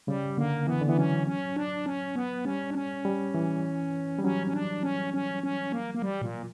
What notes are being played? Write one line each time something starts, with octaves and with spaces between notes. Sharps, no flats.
C#3 G3
D3 A#3
E3 B3
D3
E3 B3
F#3 C#4
C#4
D4
C#4
B3
G3 C#4
D4
C#4
G3
E3
G3
F#3 C#4
C#4
D4
C#4
C#4
C#4
A#3
A#3
G3
A#2